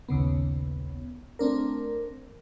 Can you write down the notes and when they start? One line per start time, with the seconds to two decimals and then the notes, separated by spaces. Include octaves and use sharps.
0.09 A#1 D#2 C#3 B3
1.39 A3 C4 D4 A#4